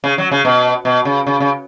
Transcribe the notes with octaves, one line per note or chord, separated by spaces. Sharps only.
C#3
F#3
C#3
B2
B2
C#3
C#3
C#3